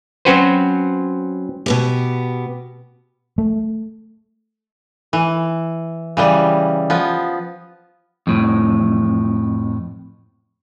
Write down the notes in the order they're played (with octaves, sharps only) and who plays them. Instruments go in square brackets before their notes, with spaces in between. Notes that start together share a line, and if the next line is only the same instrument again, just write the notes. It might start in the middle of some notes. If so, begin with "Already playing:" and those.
[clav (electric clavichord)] F#3 C4 C#4 F#4 B4 C5
[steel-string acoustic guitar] B2 B3 G4
[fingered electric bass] A3
[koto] E3
C#3 E3 G3
F3 B3
[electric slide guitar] F2 A2